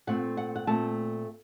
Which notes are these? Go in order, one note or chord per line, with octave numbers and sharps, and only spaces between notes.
A#2 A3 C4 F#5
F#5
F#5
A#2 A3 C4 A5